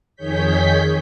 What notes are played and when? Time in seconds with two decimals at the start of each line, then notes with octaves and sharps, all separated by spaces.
0.16 F2 D#3 G#4 C#5 G6 B6